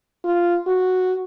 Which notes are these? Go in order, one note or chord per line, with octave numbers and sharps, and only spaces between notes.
F4
F#4